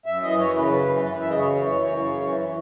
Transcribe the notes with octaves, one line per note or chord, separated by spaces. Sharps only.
F#2 E5
E3 D#5
F#2 C#5
C#3 B4
F#2
E3
F#2
C#3 E5
D#5
F#2 C#5
E3
F#2
C#3
F#2
E3